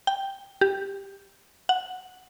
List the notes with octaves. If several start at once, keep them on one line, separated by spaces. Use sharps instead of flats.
G5
G4
F#5